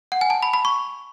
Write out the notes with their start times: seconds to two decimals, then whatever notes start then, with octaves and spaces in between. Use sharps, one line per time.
0.12 F#5
0.21 G#5
0.30 A5
0.42 B5
0.53 B5
0.65 C#6